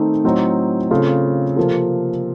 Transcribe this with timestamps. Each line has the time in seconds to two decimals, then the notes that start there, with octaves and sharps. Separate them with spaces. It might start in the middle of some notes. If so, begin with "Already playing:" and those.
Already playing: D#3 A3 C4 D#4
0.24 A2 F#3 C4 D#4
0.90 C#3 A3 C4 F4 A4
1.56 C3 F3 A#3 F4 A4